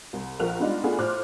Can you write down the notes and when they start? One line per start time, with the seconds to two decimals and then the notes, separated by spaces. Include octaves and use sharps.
0.13 C2
0.40 A#1 F3 A#4 F#6 F7
0.59 G3 G#3 B3 D4 D#4 F4
0.84 A3 B3 D4 F4 F#4 G#4
0.98 A2 F4 C5 D6 F6 F#6